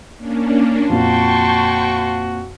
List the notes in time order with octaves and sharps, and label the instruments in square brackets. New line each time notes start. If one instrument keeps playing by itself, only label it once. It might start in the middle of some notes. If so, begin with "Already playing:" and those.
[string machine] A#3 C#4 D4
[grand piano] F2 A#2 [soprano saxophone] F#4 [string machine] G5 C#6 [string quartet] A5 C6